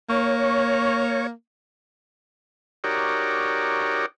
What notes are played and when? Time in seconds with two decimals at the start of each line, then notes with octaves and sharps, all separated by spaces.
0.09 A#3 C#5
2.84 D#4 F#4 G4 A#4 C#5 D5